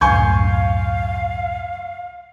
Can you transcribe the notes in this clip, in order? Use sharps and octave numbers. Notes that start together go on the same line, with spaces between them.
C#2 F#2 A2 F5 G#5 C#6 G6